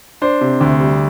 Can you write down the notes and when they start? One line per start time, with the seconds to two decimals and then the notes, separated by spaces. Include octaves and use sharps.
0.22 D4 C5
0.41 C3
0.61 D2
0.80 G3